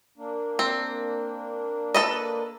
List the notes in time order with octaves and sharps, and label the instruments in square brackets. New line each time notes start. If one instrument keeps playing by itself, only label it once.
[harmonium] A#3 D4
[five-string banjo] C4
A4 B4 D#5